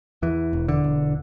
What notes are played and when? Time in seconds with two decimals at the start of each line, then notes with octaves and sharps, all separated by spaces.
0.22 E2 E3
0.53 E1
0.68 D3
0.84 E1